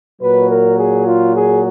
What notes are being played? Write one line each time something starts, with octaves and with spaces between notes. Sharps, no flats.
A#2 F#3 B4
A#4
G#4
F4
G#4